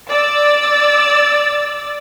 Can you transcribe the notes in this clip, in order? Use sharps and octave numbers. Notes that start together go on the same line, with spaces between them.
D5 E6 A6